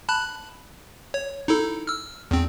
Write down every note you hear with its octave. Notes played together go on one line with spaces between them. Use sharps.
A5 B5 F#6
C#5
D#4 E4 A4
E6 F6
E2 C4